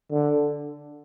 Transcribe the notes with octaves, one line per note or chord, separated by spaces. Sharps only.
D3